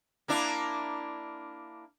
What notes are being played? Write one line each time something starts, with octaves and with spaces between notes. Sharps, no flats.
A#3 D4 E4